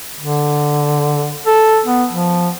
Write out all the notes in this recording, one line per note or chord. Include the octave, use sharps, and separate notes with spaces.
D3
A4
B3
F3